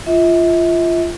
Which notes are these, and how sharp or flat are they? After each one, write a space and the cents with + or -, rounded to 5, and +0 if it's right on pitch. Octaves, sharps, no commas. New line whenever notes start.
F4 -20 E5 -35